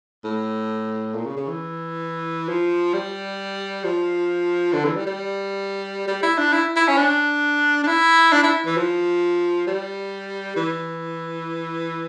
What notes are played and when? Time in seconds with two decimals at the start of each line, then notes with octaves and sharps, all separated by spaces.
0.24 A2
1.15 A#2
1.25 C#3
1.37 C#3
1.48 E3
2.49 F3
2.93 G3
3.84 F3
4.73 D3
4.85 E3
4.96 G3
5.07 G3
6.08 G3
6.22 E4
6.38 D4
6.53 E4
6.76 E4
6.88 C#4
6.97 D4
7.83 D4
7.88 E4
8.33 D4
8.43 E4
8.66 E3
8.77 F3
9.67 G3
10.56 E3